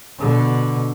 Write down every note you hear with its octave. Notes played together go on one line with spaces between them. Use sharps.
B2 D3